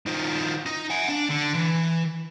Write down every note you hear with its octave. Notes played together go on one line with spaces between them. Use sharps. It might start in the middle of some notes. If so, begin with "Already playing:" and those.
D#3 F3
D#4
F#5 G#5
D4
D3
E3